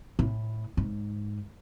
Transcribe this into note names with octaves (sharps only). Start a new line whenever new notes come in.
A2
G#2